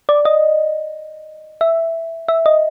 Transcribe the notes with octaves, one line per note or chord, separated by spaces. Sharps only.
D5
D#5
E5
E5
D#5